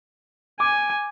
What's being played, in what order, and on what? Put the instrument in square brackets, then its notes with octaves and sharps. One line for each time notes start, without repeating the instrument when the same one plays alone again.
[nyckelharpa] G#5 [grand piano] D6